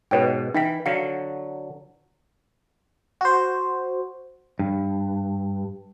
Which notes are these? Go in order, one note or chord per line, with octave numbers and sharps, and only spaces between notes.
G#2 B2 B4 C#5 G5
E3 D#4 G5 B6
D3 F#3 F5 C#7
F#4 C5
G2